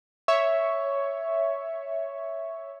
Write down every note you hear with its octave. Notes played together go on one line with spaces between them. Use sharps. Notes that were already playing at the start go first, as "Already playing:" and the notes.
C#5 E5 C#6